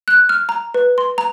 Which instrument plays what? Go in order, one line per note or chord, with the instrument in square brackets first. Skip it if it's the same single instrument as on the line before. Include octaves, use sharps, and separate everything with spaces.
[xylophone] F#6
F6
A#5
B4
C6
A#5